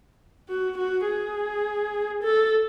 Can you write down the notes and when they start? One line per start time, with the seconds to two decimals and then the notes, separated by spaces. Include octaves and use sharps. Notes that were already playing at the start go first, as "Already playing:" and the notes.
0.49 F#4
0.77 F#4
1.06 G#4
2.23 A4